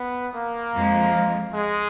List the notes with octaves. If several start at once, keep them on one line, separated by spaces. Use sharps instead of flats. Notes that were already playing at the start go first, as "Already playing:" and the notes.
Already playing: B3
A#3
F2 F3 G#3
G#3